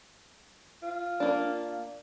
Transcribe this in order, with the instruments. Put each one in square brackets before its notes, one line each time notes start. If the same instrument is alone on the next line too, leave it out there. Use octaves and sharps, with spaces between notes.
[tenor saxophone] F4
[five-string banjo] A#3 D4